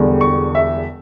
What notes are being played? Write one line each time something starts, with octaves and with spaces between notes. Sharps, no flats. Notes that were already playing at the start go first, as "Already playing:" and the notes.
Already playing: E1 E2 D3 G3
C#6
E5